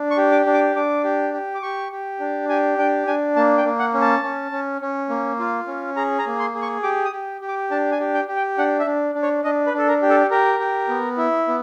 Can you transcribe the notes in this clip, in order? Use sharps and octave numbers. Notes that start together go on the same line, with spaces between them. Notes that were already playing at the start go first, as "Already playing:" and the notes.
Already playing: D4
C#6
G4
D6
D4
D6
D4 D6
G4
G4
D6
G4 C#6
G4
D4
G4 G#5
D4 G5
D4 G#5
A#3 A5
G5
A#3
F#5
C#4
A5
C#4
C#4
C#4
A#3
F4
C#4
G#4 A#5
A#5
A#3
C6
G#4
C#6
G4 D6
D#6
G4
G4
D6
D4 A5
G#5
G4
G5
G4
G5
D4 F#5
E5
D4
D4
C#5
D4 D#5
B4
D4 A4
A#4
G4
A4
G4 A#4
G4
B3
E4
B3